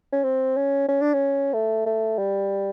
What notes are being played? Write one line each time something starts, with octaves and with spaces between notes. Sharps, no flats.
C#4
C4
C#4
C#4
D4
C#4
A3
A3
G3